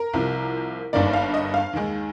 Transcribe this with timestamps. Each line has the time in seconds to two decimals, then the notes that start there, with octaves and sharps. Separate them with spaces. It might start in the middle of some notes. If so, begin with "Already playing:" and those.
Already playing: A#4
0.13 C2 C3 F3
0.93 G1 G2 D#3 A#3 D5
1.13 F5
1.34 D#5
1.54 F5
1.73 D#2 D#3 G#3